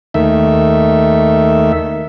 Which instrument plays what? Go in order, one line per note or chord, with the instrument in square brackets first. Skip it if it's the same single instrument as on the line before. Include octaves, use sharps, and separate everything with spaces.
[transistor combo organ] D#2 D#3 A3 E5